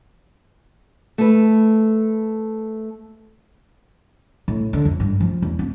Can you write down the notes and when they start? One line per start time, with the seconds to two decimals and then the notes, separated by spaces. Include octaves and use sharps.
1.18 A3 B4
4.48 A2
4.73 D3
4.85 F2
5.00 G2
5.21 F3
5.42 E2
5.59 C4